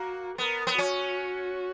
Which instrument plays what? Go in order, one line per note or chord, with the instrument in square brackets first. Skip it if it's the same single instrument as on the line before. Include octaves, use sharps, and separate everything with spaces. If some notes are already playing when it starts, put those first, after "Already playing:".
Already playing: [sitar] A#3 [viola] F#4
[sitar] B3 [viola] A#4
[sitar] B3
[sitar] C#4 [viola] F#4